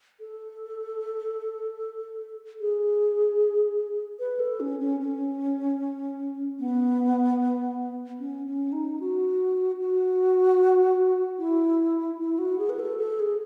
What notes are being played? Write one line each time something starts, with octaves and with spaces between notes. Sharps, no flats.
A4
G#4
B4
A4
C#4
C#4
C#4
B3
C#4
C#4
D#4
F#4
F#4
E4
E4
F#4
G#4
B4
A4
A4
G#4